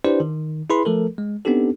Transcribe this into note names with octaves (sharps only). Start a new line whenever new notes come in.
D4 E4 G4 B4 C5 D5
D#3
E4 G#4 B4 B5 C6
F3 A3 A4 A#4
G#3
B3 C4 D4 D#4 G4 A4